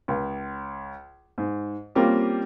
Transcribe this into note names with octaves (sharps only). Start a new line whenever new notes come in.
C#2
G#2
G3 A#3 C4 C#4 F4 G4